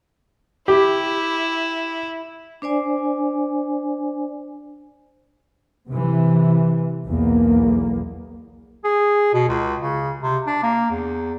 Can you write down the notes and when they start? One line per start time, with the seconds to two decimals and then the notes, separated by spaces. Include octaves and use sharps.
0.68 E4 G4
2.62 D4 C5 D5 G#5
5.89 C3 E3
7.07 B1 E2 A#3
8.84 G#4
9.33 B2
9.49 C#2
9.80 C#3
10.23 C3
10.47 D4
10.63 A#3
10.91 E2